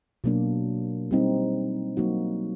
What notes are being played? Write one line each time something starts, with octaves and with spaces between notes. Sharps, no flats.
B2 F#3 A#3 D4
G3 C4 D#4
F#3 A#3 D#4 F#4